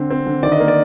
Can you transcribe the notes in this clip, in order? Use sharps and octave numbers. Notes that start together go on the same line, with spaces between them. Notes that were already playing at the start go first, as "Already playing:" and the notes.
Already playing: D3 C4
C4
D3
D#3 D5
D#5
A#3 A#4
D5